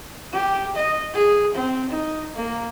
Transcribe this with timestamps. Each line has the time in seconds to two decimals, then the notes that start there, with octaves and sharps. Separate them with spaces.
0.33 G4
0.75 D#5
1.14 G#4
1.55 C4
1.90 D#4
2.36 A#3